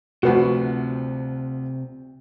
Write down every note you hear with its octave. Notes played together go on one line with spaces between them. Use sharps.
D2 C3 F3 F#4 B4 F#5